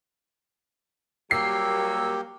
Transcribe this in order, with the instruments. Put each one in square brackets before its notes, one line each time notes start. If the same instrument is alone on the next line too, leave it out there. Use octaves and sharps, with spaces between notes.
[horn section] F#3 G3 A#3 [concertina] G4 [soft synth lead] E6 [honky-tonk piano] C7